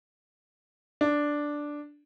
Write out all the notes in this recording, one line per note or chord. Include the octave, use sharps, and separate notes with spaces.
D4